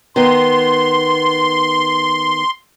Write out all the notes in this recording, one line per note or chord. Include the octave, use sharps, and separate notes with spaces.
D#3 B3 C6